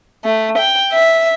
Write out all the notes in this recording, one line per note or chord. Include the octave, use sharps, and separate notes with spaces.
A3
G5
E5